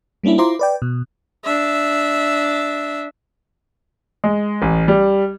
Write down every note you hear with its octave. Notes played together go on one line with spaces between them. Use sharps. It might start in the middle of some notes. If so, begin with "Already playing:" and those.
G3 A#3 C#4 D4 E4
E4 F4 C5 A#5 C6 D6
B4 D5 G5
B2
D4 E5
G#3
A1
G3